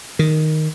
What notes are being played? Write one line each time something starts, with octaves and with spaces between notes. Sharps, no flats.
D#3